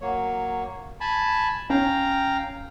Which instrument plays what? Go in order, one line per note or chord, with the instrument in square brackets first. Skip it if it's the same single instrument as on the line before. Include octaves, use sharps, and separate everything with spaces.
[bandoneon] F#3 A#3 C#5
G#5 A5 B5
[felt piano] C#4 [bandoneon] F5 G5 A#5